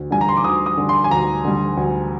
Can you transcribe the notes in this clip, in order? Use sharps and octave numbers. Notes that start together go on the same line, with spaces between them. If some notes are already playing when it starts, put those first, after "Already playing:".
Already playing: D2
D3 G3 G#5
A#5
C6
D6
D2 D#6
D#6
D3 G3
C6
G#5
D2 A#5
D3 G3
D2